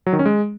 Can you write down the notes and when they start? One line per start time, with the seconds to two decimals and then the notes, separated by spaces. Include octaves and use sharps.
0.06 F#3
0.13 D#3
0.19 C#4
0.26 G#3